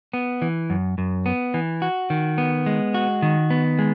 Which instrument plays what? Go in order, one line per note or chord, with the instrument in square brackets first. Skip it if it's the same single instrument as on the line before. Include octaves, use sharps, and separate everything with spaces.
[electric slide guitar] B3
E3
F#2
F#2
B3
E3
F#4
D#3
B3
G#3
F#4
D#3
B3
G#3